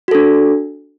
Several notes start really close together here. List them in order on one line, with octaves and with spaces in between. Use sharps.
F#4 A4 D4